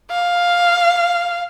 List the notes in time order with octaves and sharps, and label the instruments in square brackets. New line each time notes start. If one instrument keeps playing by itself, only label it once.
[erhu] F5